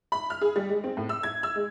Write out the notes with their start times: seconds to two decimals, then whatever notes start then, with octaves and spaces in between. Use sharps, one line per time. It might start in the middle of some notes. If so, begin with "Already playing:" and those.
0.12 B5
0.30 F6
0.41 G#4
0.56 G3
0.69 G#3
0.84 C4
0.97 A2
1.09 E6
1.23 G#6
1.43 E6
1.56 G#3